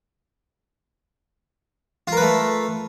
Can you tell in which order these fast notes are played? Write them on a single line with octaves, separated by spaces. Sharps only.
F4 A#4 B4 A3